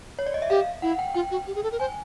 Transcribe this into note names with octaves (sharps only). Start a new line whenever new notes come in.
C#5
D5
D#5
E5
G4 F5
E4 F#5
G5
F4 G5
F#4
G4
G#4
A4
A#4
C5 G#5